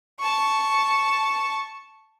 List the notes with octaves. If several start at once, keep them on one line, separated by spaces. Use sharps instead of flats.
A5 C#6